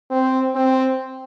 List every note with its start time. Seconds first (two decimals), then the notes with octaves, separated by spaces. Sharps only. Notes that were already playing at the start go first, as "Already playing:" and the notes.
0.11 C4
0.55 C4